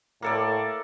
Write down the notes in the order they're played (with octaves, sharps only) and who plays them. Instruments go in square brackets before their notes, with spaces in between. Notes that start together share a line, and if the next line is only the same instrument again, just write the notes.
[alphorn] A2 [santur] A#3 A4 D5